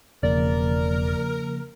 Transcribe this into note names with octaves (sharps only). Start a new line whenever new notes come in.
E1 C#3 F3 A#3 A#4 D5